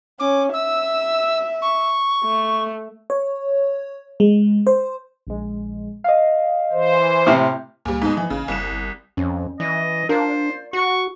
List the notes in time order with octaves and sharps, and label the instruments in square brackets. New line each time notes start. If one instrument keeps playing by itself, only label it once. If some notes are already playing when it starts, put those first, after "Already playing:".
[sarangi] C#4 [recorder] D6
[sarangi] E5 [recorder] E6
[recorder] C#6
[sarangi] A3
[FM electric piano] C#5
G#3
C5
[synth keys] A#1 G#3
D#5 F5
[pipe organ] E3 C5
[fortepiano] A2 C3 [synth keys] F6
[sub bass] C#2 [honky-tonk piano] A#2 G3
[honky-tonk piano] G#2 B2
[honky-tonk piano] E3 [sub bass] F3
[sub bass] A1 [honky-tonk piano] C#3
[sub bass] F#1 [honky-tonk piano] C2 E7
[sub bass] G1
[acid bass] F2 [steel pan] C#4
[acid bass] E3 [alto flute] D5 [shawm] D#5
[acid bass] D4 [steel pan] F4 A#4 [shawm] C5
[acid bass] F#4 [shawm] C#6